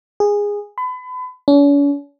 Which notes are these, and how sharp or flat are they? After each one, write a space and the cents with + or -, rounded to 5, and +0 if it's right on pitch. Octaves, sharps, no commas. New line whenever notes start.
G#4 -15
B5 +35
C#4 +45